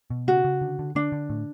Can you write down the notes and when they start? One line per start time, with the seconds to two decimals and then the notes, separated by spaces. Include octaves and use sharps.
0.10 B2
0.27 C#3 F#4
0.45 C#3
0.61 D3
0.79 D3
0.95 D3 D4
1.12 D3
1.30 A2